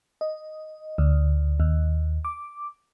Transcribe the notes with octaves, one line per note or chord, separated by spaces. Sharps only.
D#5
D2
D#2
D6